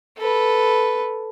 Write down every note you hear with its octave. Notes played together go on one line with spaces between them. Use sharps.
A4 B4